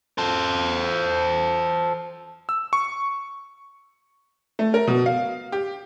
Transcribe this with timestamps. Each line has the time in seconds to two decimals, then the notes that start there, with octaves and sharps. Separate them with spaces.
0.18 A4 C5
2.49 E6
2.73 C#6
4.59 A3
4.74 A#4
4.88 B2
5.06 F5
5.52 G4